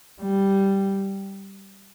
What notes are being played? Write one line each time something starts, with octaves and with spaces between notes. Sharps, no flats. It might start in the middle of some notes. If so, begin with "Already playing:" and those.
G3